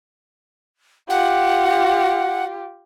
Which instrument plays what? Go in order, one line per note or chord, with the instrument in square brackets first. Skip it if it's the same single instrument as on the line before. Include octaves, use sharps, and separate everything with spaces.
[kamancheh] F4 G4 [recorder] F#5